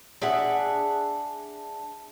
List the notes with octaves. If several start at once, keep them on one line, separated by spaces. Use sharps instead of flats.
D4 G#4 E5 F#5